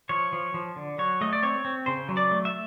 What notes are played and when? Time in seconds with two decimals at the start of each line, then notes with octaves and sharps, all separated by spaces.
0.09 F3 C#5
0.33 F3
0.54 F3
0.76 D3
0.98 F#3 C#5
1.21 A3 D#5
1.33 D5
1.43 C4 C#5
1.65 C4
1.86 C#3 C5
2.09 F#3
2.17 D5
2.31 A3
2.45 E5